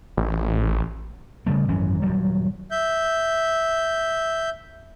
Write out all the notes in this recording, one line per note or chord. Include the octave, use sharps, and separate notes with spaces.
A1
C#3 G3 A3
G#1 F#2 E3 C#4
D#1 G2 F#3 G3
E5 G6